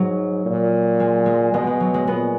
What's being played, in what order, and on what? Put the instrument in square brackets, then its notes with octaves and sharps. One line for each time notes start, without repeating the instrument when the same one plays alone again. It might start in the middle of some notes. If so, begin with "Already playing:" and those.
Already playing: [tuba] G#2 [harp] F#3
[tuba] A#2
[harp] G#3
G#3
[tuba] B2 [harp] G#3
[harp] G#3
F#3
G#3
[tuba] A#2 [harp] G#3 B3